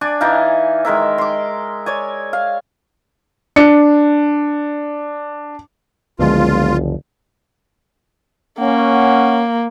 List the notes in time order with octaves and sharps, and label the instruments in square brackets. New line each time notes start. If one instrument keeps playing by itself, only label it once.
[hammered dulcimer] D4 D5 G#5
E3 D#4 D5 F5
D#3 G#3 A#4 E5
C6 D6
C#5 D5 G#5
F5
[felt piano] D4 C#7
[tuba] F#1 [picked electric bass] C#2 D3 F3 [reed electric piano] G#3 B3 [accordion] F4
[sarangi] A#3 [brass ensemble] C#4 F#5